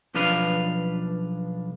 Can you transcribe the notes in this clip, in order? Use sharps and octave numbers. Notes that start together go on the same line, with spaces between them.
B1 F3 D4 B4 F5